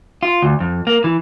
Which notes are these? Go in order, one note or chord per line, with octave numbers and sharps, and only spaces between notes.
F4
D2
F2
A#3
E3